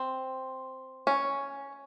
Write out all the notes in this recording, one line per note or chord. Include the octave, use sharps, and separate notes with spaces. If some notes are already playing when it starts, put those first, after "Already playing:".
Already playing: C4
C#4